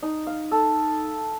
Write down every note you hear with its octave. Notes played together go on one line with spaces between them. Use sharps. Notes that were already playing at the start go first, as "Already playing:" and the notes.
D#4
F5
A4